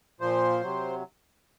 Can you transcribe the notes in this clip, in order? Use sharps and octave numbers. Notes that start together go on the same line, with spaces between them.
A#2 F3 C5
C3 F#3